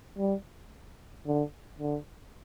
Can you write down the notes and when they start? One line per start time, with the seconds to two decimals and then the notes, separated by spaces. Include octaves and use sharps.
0.18 G3
1.26 D3
1.80 D3